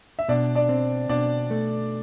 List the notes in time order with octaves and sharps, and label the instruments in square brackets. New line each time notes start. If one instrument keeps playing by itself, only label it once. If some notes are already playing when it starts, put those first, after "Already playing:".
[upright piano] E5
[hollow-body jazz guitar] B2 [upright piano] D4 D5
[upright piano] D4 D5
[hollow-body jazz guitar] C4
[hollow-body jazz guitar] B2 [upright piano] D4 D5
[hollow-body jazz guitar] A3